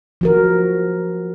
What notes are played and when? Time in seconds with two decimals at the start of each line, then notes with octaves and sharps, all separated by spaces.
0.21 F3 F#4 A#4